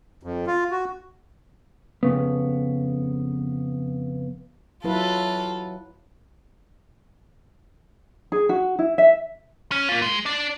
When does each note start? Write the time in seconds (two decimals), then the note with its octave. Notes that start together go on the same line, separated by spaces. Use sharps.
0.23 F2
0.47 F4
0.71 F#4
2.03 F2 C#3 B3
4.84 F#3 E4 F4 A4 B4
8.32 G#4
8.49 F#4
8.79 E4
8.98 E5
9.72 C#4
9.89 A#3 F4
10.02 G#3
10.26 D4 D5